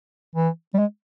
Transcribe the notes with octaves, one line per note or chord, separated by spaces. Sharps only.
E3
G3
G#3